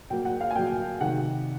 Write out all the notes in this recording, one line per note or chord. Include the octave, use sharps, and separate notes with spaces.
B2 F#3 A#3 G5
F#5
F5
G#5
B2 F#3 A#3 G5
C3 D#3 F#3 F#5